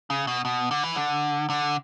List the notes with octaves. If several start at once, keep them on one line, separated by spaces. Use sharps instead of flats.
C#3
B2
B2
D3
E3
D3
D3